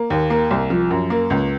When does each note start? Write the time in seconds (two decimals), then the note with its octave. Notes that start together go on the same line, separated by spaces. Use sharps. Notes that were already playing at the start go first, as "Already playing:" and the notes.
Already playing: A#3
0.10 D#2
0.30 A#3
0.51 C2
0.70 F3
0.90 F#2
1.10 A#3
1.30 C#2